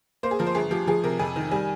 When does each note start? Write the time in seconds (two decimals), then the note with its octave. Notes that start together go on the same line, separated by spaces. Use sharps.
0.23 A#3 C5
0.31 G#4
0.39 F3 A#4
0.47 C5
0.55 G1 G#4
0.71 F3 G4
0.87 F3 G#4
1.03 C3 A#4
1.19 F2 G#5
1.36 D#3
1.51 G3 G#5